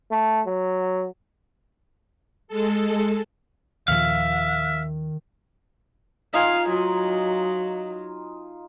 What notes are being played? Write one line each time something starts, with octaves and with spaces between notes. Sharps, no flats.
A3
F#3
G#3 A4
D#2 A#2 D#3 F3 E5 F5
D#4 F4 F5 G#5
F#3